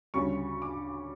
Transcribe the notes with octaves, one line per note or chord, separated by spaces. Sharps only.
D2 C#3 G3 C#4 C#6
D6